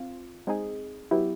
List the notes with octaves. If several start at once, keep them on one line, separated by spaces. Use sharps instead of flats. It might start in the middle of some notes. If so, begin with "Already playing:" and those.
Already playing: C4 F4
G#3 C4 D#4 G#4
F#3 B3 E4 G4